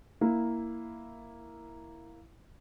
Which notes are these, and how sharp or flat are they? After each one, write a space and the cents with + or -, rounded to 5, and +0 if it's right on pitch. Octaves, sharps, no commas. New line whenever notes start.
A#3 +0 E4 +0